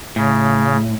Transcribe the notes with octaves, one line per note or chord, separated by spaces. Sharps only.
A2 C#3